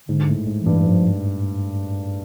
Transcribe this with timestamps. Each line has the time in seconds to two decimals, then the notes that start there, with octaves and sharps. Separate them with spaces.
0.08 G#2 D3
0.28 A2
0.47 G#2
0.60 E3
0.66 G2
0.86 G#2 F3